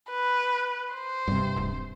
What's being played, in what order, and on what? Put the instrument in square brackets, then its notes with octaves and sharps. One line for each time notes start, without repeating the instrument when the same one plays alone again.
[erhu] B4
C5
[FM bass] E1 [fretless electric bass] G2 C3
[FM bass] D1